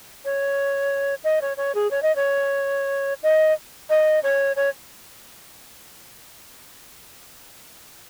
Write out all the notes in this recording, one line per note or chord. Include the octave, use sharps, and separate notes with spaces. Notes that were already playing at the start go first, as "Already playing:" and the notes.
C#5
D#5
C#5
C#5
G#4
C#5
D#5
C#5
D#5
D#5
C#5
C#5